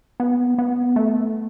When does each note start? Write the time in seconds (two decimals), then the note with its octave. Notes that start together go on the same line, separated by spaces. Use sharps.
0.20 B3
0.58 B3
0.96 A3